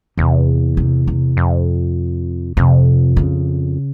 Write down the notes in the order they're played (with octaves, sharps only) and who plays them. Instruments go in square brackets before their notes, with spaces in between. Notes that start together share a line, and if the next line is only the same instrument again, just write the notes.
[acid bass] E2 [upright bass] C3
[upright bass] C3
C3
[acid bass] F2
[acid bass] F2 [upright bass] C3
[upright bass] C#3